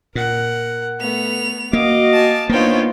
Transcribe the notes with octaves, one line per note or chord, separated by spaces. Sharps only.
A#2 A#4 F#5
A3 B3 F7
A#3 F#4 D#5 F5 D6
G#5 A5
A#3 B3 D4 D#4 F4 C5 C#5 G5